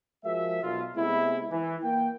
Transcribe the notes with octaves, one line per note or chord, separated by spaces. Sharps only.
F3 G#3 F#4 A#4 E5
B1 F4
C3 G#3 A3 B3 E4
E3
A#3 G5